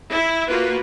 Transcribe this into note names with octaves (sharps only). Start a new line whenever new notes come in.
E4
A#3 F4 F#4 B4